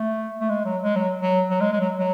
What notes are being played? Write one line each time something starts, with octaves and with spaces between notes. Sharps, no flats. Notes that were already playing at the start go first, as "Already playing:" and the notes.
Already playing: A3
A3
G#3
F#3
G#3
F#3
F#3
F#3
G#3
G#3
F#3
F#3